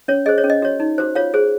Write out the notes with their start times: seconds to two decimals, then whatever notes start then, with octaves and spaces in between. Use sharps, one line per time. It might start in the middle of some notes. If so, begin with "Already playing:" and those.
0.08 C#4 C#5
0.26 G#4 C5 D#5
0.38 C#5
0.44 C#4
0.50 D#5
0.62 F#4 C#5
0.80 D#4
0.98 F#4 C5
1.15 F4 C#5 F5
1.34 G#4 C5